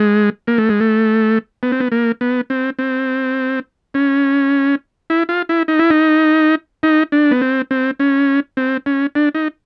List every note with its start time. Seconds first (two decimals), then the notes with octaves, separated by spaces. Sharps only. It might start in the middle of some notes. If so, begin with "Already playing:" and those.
Already playing: G#3
0.47 A#3
0.58 A3
0.69 G#3
0.81 A3
1.63 B3
1.72 C4
1.80 B3
1.92 A#3
2.21 B3
2.50 C4
2.79 C4
3.94 C#4
5.10 E4
5.29 F4
5.49 E4
5.68 D#4
5.79 E4
5.90 D#4
6.83 D#4
7.12 D4
7.31 B3
7.41 C4
7.71 C4
8.00 C#4
8.57 C4
8.86 C#4
9.15 D4
9.35 D#4